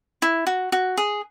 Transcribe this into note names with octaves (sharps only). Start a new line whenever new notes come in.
E4
F#4
F#4
G#4